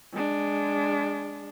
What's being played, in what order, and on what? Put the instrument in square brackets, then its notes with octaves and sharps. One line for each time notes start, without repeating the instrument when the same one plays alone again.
[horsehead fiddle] G#3 D4